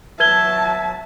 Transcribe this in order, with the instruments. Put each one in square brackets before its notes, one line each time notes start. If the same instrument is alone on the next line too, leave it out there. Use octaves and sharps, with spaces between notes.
[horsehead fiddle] F#3 A5 [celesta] B4 G#6 G7 [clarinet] E5